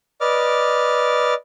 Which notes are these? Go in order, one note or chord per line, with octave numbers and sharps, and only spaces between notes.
B4 D5 D#5 D6 F6